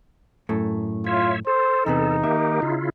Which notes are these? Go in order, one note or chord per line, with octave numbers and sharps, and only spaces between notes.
F#2 A2 A3
F4 C#5 E5
A4 C5
E2 C3 B3 D#4
D#3 A#3 G4 E5
C#3 E4 F4